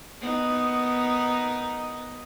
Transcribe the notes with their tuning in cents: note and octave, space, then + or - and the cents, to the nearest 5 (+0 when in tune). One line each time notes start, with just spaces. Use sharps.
B3 +0 D#4 +0 A#4 +0